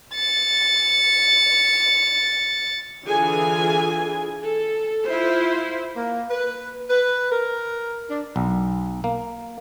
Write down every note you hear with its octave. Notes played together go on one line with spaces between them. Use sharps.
A6 C#7
D3 E3 F4 G#4 G#5
A4
E4 F4 C5
A#3
B4
B4
A#4
D4
B1
A#3